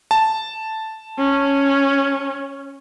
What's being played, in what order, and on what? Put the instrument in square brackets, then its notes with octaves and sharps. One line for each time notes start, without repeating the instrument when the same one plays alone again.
[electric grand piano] A5
[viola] C#4